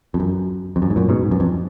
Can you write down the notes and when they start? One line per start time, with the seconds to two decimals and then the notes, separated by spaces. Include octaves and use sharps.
0.14 F2
0.20 F#2
0.76 F2
0.82 F#2
0.90 G#2
0.96 F#2 A#2
1.09 G#2 B2
1.23 G#2
1.31 F#2
1.40 F2